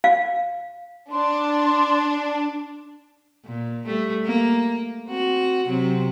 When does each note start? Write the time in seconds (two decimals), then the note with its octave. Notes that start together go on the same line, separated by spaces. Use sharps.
0.04 F5
1.12 D4 C6
3.45 A#2
3.87 G3 A3
4.25 A#3
5.08 C4 F#4
5.67 C3 F#3 C4